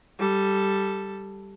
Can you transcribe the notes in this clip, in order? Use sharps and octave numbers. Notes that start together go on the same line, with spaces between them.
G3 A4